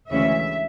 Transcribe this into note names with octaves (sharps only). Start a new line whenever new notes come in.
D2 C#3 E3 G#3 C#4 E5